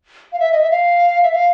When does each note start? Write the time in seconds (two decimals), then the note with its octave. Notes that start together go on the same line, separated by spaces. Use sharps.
0.32 F5
0.39 E5
0.52 D#5
0.62 E5
0.70 F5
1.23 E5
1.32 F5